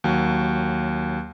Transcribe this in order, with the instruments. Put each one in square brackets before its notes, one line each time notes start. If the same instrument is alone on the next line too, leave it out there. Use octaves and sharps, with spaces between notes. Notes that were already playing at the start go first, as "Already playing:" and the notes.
[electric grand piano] D#2 F#3